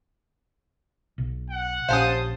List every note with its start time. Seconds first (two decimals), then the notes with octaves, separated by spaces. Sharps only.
1.18 B1
1.50 F#5
1.88 A#1 C#4 G4 C5 F5 A5 D#6